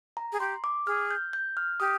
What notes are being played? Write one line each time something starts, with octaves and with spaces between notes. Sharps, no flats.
A#5
G#4
G4 C6
D6
G#4 F6
G6
G6
F6
G4 D#6